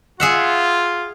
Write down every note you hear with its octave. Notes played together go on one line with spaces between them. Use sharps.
F4 G#4 E5 F#5